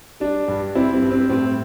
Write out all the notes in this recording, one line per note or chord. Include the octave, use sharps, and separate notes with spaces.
G3 D4
G2
G3 C4 E4
C4
G2
C4
A2 C4